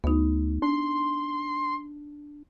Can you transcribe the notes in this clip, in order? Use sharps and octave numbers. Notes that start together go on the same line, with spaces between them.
D2 B3 D#4
D4 C6